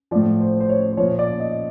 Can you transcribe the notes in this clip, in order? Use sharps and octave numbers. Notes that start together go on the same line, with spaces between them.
A2 F3 D5
C5
C5
C#5
C5
A#2 F3 C#5
D5
D#5